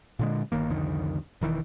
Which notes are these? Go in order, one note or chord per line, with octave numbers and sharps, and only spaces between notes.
A#2 D3 G#3
G1 D#3 A#3
C2 F2 D3 D#3
E1 D#3 E3